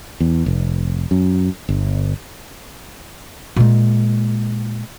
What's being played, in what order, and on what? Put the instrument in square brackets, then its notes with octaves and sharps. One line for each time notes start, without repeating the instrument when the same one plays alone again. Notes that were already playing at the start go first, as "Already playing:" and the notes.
[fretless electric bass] E2
F1
F#2
G1
[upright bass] A#2 G#3